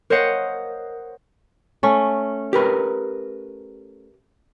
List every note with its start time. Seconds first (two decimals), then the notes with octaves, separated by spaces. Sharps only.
0.10 A#4 C5 C#5 D#5 F5 F#5
1.83 A3 C#4
2.53 G4 A#4 B4